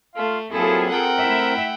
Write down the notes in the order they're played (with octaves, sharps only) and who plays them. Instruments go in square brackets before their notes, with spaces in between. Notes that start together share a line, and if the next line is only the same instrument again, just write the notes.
[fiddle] A3 [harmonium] F4 F5
[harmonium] F#3 A#3 C4 [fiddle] E4 [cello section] F4 G#4 A4
[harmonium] C4 A#4 [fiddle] F#5 G5
[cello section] A3 E4 E5